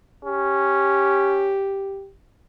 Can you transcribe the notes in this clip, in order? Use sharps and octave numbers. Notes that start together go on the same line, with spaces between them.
C#4 G4